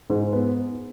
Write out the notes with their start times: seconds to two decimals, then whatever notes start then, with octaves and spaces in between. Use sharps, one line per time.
0.10 G#2
0.33 B3